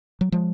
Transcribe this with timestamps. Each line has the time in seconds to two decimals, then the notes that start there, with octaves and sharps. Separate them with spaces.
0.21 F#3
0.32 F3 G#3